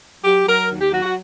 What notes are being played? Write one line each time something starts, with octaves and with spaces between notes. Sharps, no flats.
F#3 G4
F#3 A#4
D#2
G4
F#3 F#4
F#4